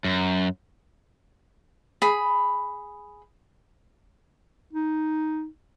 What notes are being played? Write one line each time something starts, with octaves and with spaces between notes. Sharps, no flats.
F#2
G#4 B5
D#4